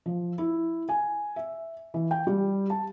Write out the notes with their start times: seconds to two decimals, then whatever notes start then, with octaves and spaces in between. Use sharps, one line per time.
0.06 F3
0.38 E4
0.89 G#5
1.36 E5
1.94 E3
2.11 G5
2.27 G3
2.70 A5